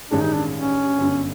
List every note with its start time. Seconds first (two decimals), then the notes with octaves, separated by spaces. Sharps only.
0.11 A1 G2 D#3 G#3 C#4 D4
0.21 D#4
0.34 D4
0.54 C#4
0.98 G1 F#2 D3